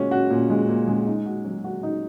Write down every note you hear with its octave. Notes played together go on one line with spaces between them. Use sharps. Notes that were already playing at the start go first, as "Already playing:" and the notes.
Already playing: A#2 G#3 C#4 F#4
F#4
A#2
G#3
A#2
G#3
D#4
F#4
F#3
F#4
D#4